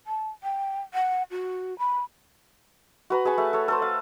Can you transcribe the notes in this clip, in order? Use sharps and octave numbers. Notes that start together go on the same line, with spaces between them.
A5
G5
F#5
F#4
B5
F#4 B4 A#5
G#4 A5 B5 C#6
A3
A4 C#5
A4 B4 C5
F5